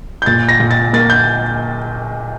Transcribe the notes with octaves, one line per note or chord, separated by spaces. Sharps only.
G6
A#2 A6
A#6
A#2
A6
A#3 A6
G6